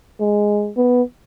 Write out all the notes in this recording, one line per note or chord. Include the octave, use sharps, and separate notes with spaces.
G#3
B3